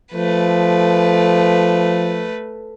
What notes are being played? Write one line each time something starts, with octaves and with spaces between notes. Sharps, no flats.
F3 A3 B4